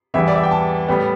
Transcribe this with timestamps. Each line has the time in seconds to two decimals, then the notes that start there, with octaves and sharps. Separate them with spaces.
0.14 E2 E3 G3 B3 E5
0.28 D5
0.36 E5
0.43 G5
0.51 A5
0.88 A2 G3 B3